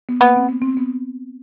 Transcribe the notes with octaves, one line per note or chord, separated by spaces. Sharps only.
B3
A#3 B3
C4
B3
C4
B3